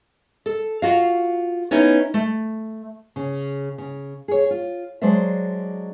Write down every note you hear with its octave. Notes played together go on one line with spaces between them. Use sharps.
A4
F4 F#4 F5
B3 C#4 D#4 E4 C#5
A3
C#3
C#3
G#4 C#5
F4
F#3 G#3 D4 C5 D5 E5